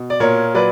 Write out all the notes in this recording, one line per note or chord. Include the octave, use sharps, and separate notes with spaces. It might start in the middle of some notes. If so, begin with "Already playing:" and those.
Already playing: B2
D5
A#2 A#4 C#5
F#3 B4 D5